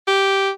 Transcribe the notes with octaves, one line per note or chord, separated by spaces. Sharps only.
G4